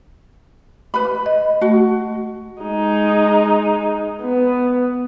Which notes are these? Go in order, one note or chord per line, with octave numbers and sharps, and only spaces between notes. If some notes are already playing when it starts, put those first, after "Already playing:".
B4 B5
D#5
A3 F#4
G#3 D#4
B3